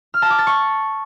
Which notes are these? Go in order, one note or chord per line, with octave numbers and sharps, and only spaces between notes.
F6
A5
D6
A6
C#6